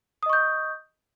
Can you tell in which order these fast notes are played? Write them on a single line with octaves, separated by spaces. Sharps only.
D#6 D#5 C#6 G6